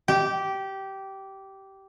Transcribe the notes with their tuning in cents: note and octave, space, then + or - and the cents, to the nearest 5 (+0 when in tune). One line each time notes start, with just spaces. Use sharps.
G4 -15